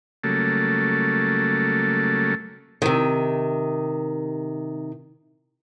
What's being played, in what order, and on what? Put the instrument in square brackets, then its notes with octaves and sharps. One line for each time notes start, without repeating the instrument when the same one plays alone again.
[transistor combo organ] C#3 F#3 G3 A3 A#3 A4
[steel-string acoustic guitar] C3 D#3